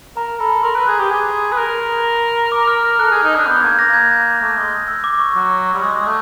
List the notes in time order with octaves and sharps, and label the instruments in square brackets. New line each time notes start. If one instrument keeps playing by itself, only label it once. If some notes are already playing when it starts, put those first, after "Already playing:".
[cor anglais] A#4 [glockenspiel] A#5
[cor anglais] A4 [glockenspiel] B5
[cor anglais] A#4 [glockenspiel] C6
[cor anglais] B4
G#4
G4
G#4
B4
A#4
[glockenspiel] D6
F6
F6
[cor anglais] A4 [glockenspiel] F#6
[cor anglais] G#4
D#4
D4
[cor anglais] B3 [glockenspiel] G6
[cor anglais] A#3 [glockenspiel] G#6
[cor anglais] A#3 [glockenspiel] A#6
[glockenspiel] G#6
[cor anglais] A3
G#3
[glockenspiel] E6
D6
C#6
[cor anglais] F#3 [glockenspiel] D6
[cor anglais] G3
G#3
G#3
A3